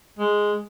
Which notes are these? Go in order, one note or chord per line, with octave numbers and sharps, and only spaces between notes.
G#3